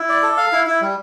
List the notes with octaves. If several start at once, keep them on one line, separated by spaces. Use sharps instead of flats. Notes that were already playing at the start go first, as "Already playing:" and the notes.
Already playing: E4
D5
A4
F5
E4
E4
G3